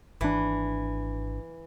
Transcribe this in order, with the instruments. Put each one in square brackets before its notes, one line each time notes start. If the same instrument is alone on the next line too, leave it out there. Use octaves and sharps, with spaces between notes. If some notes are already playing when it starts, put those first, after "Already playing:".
[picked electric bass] G#1 D4 [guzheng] E3